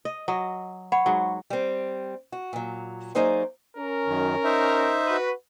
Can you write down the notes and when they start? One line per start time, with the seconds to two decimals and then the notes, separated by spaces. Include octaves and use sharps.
0.05 D#5
0.28 F#3 D#5
0.92 C#5 F#5 B5
1.06 G#2 F#3
1.50 G3 C4
2.32 F#4
2.53 A#2 F#3
3.15 F#3 A#3 D#4 G#4 C5 D5
3.77 C#4 A#4
4.07 F#2 D#3
4.44 D#4 C5 E5
5.07 F#4 B4